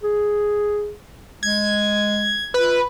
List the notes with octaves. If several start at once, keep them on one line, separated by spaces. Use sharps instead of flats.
G#4
G#3 G#6
F4 B4